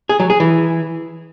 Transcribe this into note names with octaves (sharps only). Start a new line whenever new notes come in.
G#4
F#3
G#4
E3